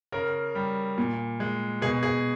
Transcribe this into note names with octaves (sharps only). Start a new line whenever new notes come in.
C#3 A#4
G3
A#2
G#3
B2 G#4
G#4